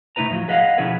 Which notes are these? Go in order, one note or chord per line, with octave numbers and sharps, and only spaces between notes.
C3 A3 D#4 E4 B4 A#5
A2 F3 F#3
G#4 B4 D#5 F5 F#5
B2 F3 C#4 E4 G#4 B4